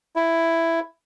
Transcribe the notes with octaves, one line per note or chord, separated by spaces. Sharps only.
E4